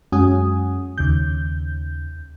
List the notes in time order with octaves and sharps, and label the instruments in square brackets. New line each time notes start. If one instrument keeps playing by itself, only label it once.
[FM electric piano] F#2 G#3 C#4 F#4 G#5 D#6
D#2 C#3 G6